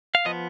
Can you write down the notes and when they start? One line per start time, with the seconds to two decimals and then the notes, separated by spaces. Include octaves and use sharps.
0.15 F5
0.25 F3 B3 D#5